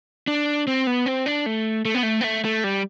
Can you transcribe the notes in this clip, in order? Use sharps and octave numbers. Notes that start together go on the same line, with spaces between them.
D4
C4
B3
C4
D4
A3
A3
B3
A3
B3
A3
A3
G3